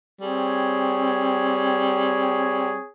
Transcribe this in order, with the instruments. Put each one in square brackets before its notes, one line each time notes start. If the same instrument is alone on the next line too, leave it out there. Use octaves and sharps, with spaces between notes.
[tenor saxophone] G3 [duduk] C4 [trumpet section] G#4 C#5